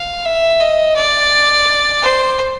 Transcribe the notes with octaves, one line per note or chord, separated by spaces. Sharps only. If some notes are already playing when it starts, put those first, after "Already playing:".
Already playing: F5
E5
D#5
D5
C5